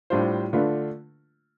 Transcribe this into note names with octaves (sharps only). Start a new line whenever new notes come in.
A2 G3 D4 F4 C5
D3 A3 D4 F4 B4